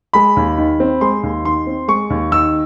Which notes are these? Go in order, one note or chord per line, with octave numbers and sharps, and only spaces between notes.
G#3 B5
D#2
D#3
C4
G#3 C6
D#2
D#3 C6
C4
G#3 C#6
D#2
D#3 E6